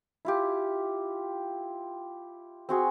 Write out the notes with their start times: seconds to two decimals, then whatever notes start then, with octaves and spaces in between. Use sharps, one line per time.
0.25 E4 F4 G4
2.69 C4 F#4 G#4